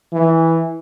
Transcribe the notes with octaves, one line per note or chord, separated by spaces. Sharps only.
E3